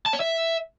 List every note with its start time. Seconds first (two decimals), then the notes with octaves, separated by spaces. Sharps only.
0.06 A5
0.13 C#5
0.20 E5